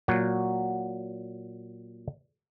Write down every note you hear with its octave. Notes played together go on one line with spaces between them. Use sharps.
A#2 F#3 F#4